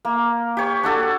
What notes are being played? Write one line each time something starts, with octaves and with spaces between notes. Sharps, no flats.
A#3
G4 C#5
D4 F#4 A4